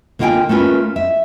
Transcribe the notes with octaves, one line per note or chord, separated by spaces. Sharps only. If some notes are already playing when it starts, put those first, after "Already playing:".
D3 A#3 F4 F5 G5 G#5
A3 A#3 C#4 F4 B4
E5